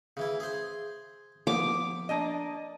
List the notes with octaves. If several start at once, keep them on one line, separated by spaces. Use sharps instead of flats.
C#3 E3 E4
G#4 C5
F3 B3 D6
A#3 D4 D#5